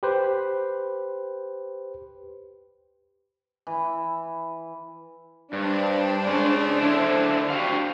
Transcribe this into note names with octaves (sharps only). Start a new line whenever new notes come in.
G4 B4 C5
E3
G2 D4 C5
G#3 C#4 G#4
D3 E4
F#4 G4 F5